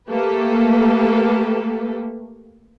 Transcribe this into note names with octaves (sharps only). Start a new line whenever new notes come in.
A3 A#3 G4 A4 B4